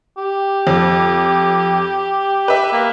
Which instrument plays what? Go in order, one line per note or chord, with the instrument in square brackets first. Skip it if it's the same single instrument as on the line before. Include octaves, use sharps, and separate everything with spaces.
[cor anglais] G4
[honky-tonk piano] F2
B4 E5
[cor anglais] A#3